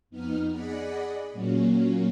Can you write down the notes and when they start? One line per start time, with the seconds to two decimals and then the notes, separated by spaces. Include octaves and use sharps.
0.10 F2 B3 D#4 F6
0.50 G#4 D5 D#5 F#5 B5
1.33 A#2 F#3 A#3 C#4